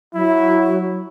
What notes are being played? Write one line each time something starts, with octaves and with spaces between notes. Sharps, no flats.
F#3 E4